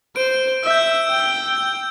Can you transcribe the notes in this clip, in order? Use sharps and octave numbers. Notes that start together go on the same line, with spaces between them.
C5 D7
E5 E6
G6
E6
G6
E6
G6
E6
G5 G6
E6
G6